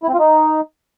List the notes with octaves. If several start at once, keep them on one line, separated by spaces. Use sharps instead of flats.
E4
C4
F4
D#4